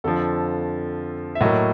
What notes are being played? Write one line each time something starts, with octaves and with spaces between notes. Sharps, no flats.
F2 D3 F3 A4
E5
A2 F#3 A#3 D#5